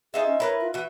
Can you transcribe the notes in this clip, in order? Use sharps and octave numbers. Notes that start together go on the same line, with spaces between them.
D#4 F4 G#4 E5
C#4
E4 A#4 B4 C#5
F4
E3 F#4 E5